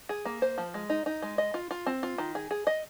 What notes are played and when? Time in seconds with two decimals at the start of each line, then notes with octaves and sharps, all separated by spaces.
0.09 G#4
0.25 A#3
0.42 C5
0.58 F3
0.74 G#3
0.90 D#4
1.06 D#4
1.22 G#3
1.38 D#5
1.54 F4
1.71 F4
1.86 C4
2.03 F4
2.18 D#3
2.35 G#4
2.51 G#4
2.67 D#5